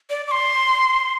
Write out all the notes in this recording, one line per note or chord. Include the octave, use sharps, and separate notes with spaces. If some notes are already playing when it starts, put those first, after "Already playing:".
D5
D6
C6